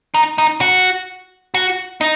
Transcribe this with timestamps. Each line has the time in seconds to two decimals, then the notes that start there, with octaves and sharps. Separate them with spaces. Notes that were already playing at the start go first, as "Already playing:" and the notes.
0.14 D#4
0.38 D#4
0.61 F#4
1.54 F#4
2.01 D#4